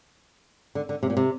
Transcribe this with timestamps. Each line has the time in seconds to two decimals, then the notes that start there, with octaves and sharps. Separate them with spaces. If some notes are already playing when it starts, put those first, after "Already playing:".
0.75 D3
0.89 D3
1.03 C3
1.10 A#2
1.17 C3